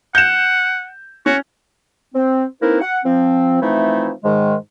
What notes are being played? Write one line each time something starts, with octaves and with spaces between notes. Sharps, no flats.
F#5 G6 E7
C#4 F#4
C4
A#3 C4 D#4 E4 A#4 B4
F#5
F3 C4
E3 F3 A3 C4 D#4 E4
G#2 D#3 G#3